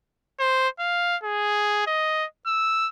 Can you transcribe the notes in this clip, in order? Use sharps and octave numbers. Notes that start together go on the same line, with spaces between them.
C5
F5
G#4
D#5
E6